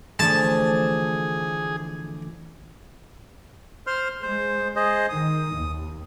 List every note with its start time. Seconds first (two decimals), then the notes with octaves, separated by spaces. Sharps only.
0.19 D3 E3 F3 A3 D4 G#4 A5
3.87 C5 C6 F6
4.22 G#3 C5
4.76 G#4 C5 D#5
5.09 D#3 D#6
5.55 D#2